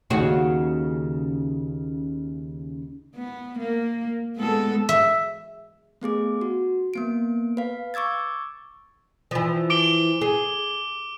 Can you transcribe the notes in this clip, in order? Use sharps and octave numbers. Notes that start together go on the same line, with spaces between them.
D#2 C#3 F#4
B3
A#3
G#3 B3 A4
E5
A3 B3 G#4 D6
F#4
A#3 B3 D7
B4 F5
C#6 D6 E6 G#6 A6
E3 F3
D6 D7 G7
G#4